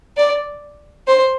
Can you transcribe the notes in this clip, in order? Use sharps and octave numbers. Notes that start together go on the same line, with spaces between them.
D5
C5